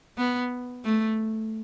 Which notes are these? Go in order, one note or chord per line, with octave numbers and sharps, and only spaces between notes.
B3
A3